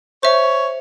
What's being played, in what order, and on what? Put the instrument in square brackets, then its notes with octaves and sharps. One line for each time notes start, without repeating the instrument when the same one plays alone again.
[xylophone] C5 E5 [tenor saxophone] C#5